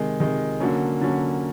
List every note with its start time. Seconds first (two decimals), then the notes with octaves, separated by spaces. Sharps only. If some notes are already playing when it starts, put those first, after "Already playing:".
Already playing: C3 D#3 G#3
0.20 C3 D#3 G#3
0.60 D3 F#3 A#3 C#4
1.01 D3 F#3 A#3 C#4